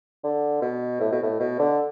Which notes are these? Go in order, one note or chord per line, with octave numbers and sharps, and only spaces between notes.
D3
B2
A2
B2
A2
B2
D3